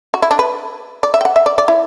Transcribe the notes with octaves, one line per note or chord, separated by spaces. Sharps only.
F#4
E4
D4
B4
D5
E5
G5
F#5
E5
D5
D5
E4